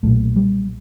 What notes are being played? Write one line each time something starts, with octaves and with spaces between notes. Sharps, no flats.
B1 A#2 A3
G3